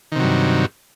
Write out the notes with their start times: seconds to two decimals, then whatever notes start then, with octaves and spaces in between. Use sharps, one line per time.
0.12 D#3
0.16 C3
0.19 F#3
0.23 G2